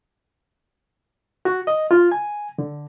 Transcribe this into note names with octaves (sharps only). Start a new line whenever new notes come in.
F#4
D#5
F4
G#5
D3